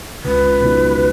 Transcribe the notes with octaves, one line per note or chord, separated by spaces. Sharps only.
C#2 B4
B2 F#3 D#4